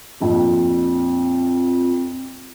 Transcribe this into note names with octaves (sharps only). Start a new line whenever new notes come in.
A#1 F2